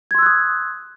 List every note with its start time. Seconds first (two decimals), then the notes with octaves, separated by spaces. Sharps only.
0.11 G#6
0.15 C6
0.18 E6
0.22 F#6
0.26 D#6